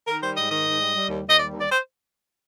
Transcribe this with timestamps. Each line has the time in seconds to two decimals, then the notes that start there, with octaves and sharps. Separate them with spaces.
0.08 D#3 A#4
0.22 G3 C5
0.37 G#2 D#5
0.51 D#3 D#5
0.66 G#2
0.81 G3
0.95 G3
1.10 D#2
1.25 D#2 D#5
1.39 G3 D5
1.53 D#2
1.61 D5
1.72 C5